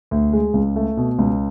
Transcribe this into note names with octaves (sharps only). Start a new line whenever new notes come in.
D2
G#3
C#2
A3
B2
C#2